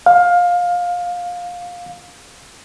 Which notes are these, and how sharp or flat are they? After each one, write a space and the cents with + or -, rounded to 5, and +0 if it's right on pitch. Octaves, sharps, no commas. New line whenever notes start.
F5 +20